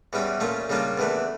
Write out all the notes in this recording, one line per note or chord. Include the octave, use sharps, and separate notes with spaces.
E2 E3 G3 C#4 G4
A#2 A3 C#4 F4
C#3 G3 A#3 D4 F4
E2 E3 A3 D4